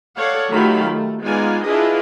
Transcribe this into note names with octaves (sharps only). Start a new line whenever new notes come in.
A4 C#5 D5 F5 F#5
D#3 F#3 A3 F4 G4 B5
A3
G#3 B3 D#4 F4 D5 G#5
D4 E4 F4 G#4 B4 D#5